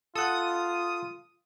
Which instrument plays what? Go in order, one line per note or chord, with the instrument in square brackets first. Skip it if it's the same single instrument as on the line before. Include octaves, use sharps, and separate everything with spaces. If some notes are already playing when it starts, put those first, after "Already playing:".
[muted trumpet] F4 [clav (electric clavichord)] A4 F#5 [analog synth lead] D#6